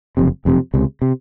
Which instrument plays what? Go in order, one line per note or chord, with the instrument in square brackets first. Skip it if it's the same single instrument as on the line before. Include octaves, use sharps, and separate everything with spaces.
[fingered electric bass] F#1 F2 C3
F#1 F2 C3
C#2 C3
C3